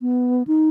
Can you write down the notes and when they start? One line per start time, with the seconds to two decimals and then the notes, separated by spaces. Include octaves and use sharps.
0.01 B3
0.47 D#4